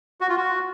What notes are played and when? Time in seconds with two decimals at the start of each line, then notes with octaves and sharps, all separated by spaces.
0.21 F#4
0.29 F4
0.37 F#4